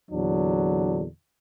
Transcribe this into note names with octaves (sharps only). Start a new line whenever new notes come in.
E2 A#2 D3 F#3 D4